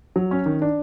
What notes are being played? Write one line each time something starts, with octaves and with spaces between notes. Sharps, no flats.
F#3
C#4
D#3
D4